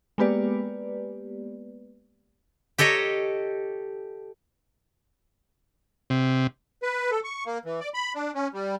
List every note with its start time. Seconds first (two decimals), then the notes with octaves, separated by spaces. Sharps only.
0.18 G#3 A#3 B3 G4 B4 D5
2.78 G4 A4 C#5 D#5 A#5
6.10 C3
6.83 B4
7.11 A4
7.24 C#6
7.46 A#3
7.65 E3
7.80 D5
7.94 B5
8.15 D4
8.35 C#4
8.54 G3